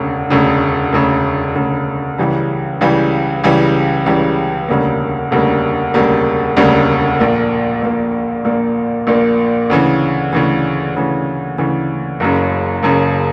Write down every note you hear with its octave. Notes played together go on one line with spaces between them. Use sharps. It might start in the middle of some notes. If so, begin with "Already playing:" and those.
Already playing: E1 D2 C#3
E1 D2 C#3
E1 D2 C#3
E1 D2 C#3
C#2 C#3 E3 G3
C#2 C#3 E3 G3
C#2 C#3 E3 G3
C#2 C#3 E3 G3
E1 D2 C#3 G3 A#3
E1 D2 C#3 G3 A#3
E1 D2 C#3 G3 A#3
E1 D2 C#3 G3 A#3
A#1 A#2 A#3
A#1 A#2 A#3
A#1 A#2 A#3
A#1 A#2 A#3
D2 C#3 E3
D2 C#3 E3
D2 C#3 E3
D2 C#3 E3
F#1 F#2 C#3
F#1 F#2 C#3